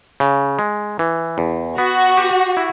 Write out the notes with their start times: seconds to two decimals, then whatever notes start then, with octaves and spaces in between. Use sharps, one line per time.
0.20 C#3
0.59 G#3
0.99 E3
1.38 E2
1.78 B3 F#4
2.17 G4
2.57 E4